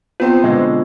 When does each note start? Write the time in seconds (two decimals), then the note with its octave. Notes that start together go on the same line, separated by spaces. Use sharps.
0.20 B3 C4 F4 C5
0.44 B2 D3 G#3